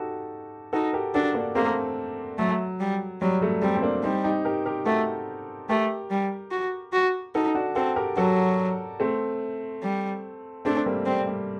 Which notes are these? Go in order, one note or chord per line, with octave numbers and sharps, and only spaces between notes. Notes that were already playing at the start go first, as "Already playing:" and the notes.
Already playing: D#4 F#4 G4 A4
D#4 F#4 A4
G4 A#4
D4 F#4 A4
A#3 D4
A3 A#3 C4
F#3 A3
G3
F#3 G3
F#3 A3
G3 A3 C4
C4
A#3 D4
G3 C4 D#4
D#4 G4
G4 A#4
G4 A#4
A3 F#4 A4
A3 G4 A#4
G3
F#4
F#4
D#4 F#4 A4
D4 F#4
C4 F#4 A4
G4 A#4
F#3 F#4 A4
A3 C4
G3
A3 C4 D4
G3 A#3
G3 C4
G3